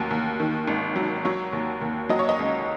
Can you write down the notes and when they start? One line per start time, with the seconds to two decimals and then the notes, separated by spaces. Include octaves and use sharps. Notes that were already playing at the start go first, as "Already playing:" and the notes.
Already playing: A1 D#2 F#3
0.11 D#2
0.40 D#3
0.68 G#1
0.96 F#3
1.25 F#3 C#5
1.53 D#2
1.81 D#2
2.09 F#3 D#5
2.19 C#5
2.29 D#5
2.39 C#2